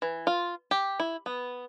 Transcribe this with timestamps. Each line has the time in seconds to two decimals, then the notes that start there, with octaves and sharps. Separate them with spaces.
0.02 E3
0.27 F4
0.71 G4
1.00 E4
1.26 B3